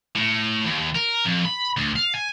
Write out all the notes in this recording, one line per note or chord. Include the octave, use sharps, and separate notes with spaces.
A2
D#2
A#4
F2
B5
D2
F5
G#5